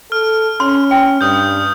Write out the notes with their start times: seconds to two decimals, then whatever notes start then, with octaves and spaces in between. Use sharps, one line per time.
0.12 A4 F6
0.60 C#4 C6
0.91 G5
1.21 G2 D#6 G6